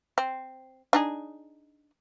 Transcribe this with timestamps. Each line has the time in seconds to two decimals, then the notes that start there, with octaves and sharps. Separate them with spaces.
0.18 C4
0.93 D4 D#4 G#4